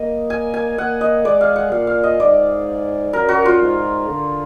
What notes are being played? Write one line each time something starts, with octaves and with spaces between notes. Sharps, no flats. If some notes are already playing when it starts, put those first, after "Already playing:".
Already playing: A#3 D#5
G#5
G#5
A#3 F#5
D#5
G#3 D5
F5
F#5
A#2 F5
F5
D#5
G#2 D5
F#2 A#4
F#4
F4
G#2
D3